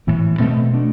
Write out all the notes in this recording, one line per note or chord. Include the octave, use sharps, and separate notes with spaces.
A2 E3 B3
B2 A3 C4
B2 A3 D4